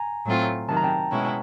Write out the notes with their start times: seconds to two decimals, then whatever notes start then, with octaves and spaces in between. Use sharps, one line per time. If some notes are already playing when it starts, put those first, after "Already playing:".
Already playing: G#5 A#5
0.26 A2 F#3 A3 C4 F4
0.68 C3 D#3 F#3 A5
0.77 A#5
0.84 G5 A5
1.11 B2 G#3 C#4 E4